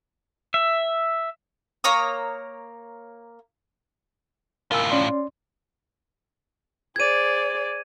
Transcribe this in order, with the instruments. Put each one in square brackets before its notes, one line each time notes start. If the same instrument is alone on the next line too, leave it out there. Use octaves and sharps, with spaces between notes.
[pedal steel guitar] E5
[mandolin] A#3 C#5 A#5 D#6
[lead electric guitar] A2 F4 [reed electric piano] A#4 G#5 E6
[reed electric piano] C#4 D5 C6
[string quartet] G#4 C5 D5 [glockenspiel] G#6 D#7